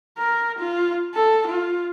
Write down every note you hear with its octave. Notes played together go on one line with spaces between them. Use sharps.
A#4
F4
A4
F4